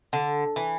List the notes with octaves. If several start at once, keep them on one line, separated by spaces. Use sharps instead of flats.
D3
E3